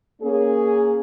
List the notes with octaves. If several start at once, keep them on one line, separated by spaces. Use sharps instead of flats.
A#3 C#4 G#4